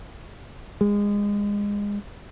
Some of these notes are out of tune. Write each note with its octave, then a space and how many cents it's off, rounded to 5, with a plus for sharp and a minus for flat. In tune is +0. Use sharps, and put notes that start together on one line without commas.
G#3 -25